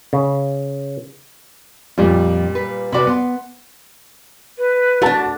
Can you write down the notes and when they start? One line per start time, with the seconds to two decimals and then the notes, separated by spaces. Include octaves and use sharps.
0.13 C#3
1.98 F2 A#2 G3 F4
2.55 B4
2.92 C3 F#4 B4 D5 B5
3.07 B3 F#5 C6
4.58 B4
5.02 A3 D4 F#4 A5